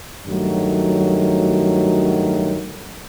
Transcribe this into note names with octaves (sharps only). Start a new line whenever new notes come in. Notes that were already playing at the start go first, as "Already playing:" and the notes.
G2 D#3 F#3 A3